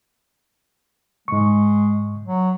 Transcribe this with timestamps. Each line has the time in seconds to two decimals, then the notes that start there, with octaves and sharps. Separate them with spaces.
1.28 G#2 G#3 C#6
2.24 F#3